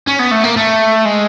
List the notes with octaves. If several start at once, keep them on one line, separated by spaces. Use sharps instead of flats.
C#4
B3
A3
A#3
A3
G#3